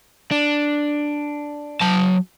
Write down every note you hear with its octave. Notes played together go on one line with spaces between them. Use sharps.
D4
F#3 A5